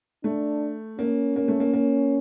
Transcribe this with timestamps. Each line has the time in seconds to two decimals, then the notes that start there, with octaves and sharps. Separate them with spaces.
0.24 A3 D4
0.99 A#3 C#4
1.36 A#3
1.48 A3
1.60 A#3
1.73 A#3